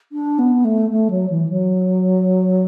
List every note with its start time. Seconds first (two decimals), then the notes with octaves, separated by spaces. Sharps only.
0.12 D4
0.38 B3
0.64 A3
0.90 A3
1.10 F#3
1.29 E3
1.49 F#3